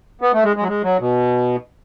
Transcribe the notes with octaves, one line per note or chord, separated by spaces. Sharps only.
B3
A3
G#3
G#3
F#3
G#3
F#3
B2